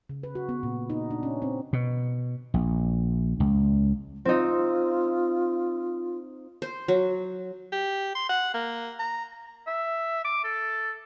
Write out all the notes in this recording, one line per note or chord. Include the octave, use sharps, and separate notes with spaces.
C#3
B4
F#4
B3
A#2
D#4
D4
C#4
C4
B2
A#1
C#2
C4 D#4 F4
C5
F#3
G4
C6
F#5
A#3
A#5
E5
D6
A4